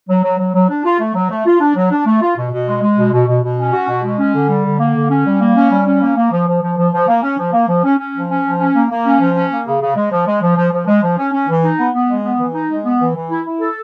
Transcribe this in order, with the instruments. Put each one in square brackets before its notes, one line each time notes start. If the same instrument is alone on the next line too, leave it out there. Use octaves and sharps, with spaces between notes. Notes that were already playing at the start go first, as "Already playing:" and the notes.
[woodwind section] F#3
F#3
F#3
F#3
D4
F4
A3
F#3
A3
F4
D4
F#3
D4
A3
F4
B2
B2
G#3
G#3
B2
B2
B2
B2
C#4
F#4
B2
G#3
C#4
D3
G3
D3
A#3
D3
C#4
G3
A#3
C#4
G3
C#4
A#3
A#3
F3
F3
F3
F3
F3
A#3
C#4
F3
A#3
F3
C#4
C#4
F3
C#4
F3
C#4
A#3
A#3
C#4
F3
C#4
A#3
C#3
C#3
G#3
F3
G#3
F3
F3
F3
G#3
F3
C#4
C#4
E3
D#4
B3
B3
G#3
B3
E3
D#4
G#3
B3
E3
E3
E4
E4
A4